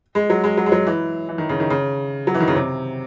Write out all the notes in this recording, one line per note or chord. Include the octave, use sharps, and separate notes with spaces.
G#3
F#3
G#3
F#3
G#3
F#3
E3
E3
D#3
C#3
D#3
C#3
F#3
E3
D#3
C#3
C3